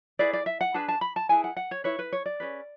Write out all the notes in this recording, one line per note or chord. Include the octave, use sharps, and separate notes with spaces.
E4 G#4 B4 D5
D5
E5
F#5
D4 G#4 B4 A5
A5
B5
A5
E4 G#4 B4 G#5
F#5
F#5
C#5
E4 B4 C#5
B4
C#5
D5
C#4 G#4 B4